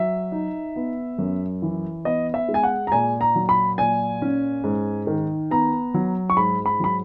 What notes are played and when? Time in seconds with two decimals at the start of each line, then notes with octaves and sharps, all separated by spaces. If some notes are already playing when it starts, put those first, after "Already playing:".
Already playing: F#3 E5
0.32 D#4
0.76 B3
1.19 F#2
1.62 E3
2.05 B3 D#5
2.34 E5
2.49 G#3
2.54 G#5
2.63 F#5
2.87 A#5
2.92 A#2 G#5
3.21 A#5
3.35 F#3
3.49 B5
3.78 A#2 G#5
4.22 C#4
4.64 G#2
5.07 D#3
5.51 B3 A#5
5.94 F#3
6.30 C#6
6.37 G#2 B5
6.66 B5
6.80 F#3 B5